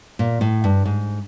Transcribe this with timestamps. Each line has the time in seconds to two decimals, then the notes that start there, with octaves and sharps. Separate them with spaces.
0.19 A#2
0.41 A2
0.64 G2
0.85 G#2